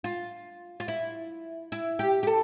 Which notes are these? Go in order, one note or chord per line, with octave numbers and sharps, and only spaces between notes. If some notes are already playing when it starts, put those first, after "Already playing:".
F4
F4
E4
E4
G4
G4
A4